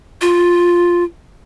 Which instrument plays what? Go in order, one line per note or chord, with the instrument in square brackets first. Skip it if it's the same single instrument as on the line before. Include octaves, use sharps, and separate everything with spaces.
[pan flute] F4